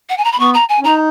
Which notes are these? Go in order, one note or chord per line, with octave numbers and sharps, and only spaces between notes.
F#5
G#5
A#5
B5
B3 C#6
A#5
G#5
C#4
D#4 A#5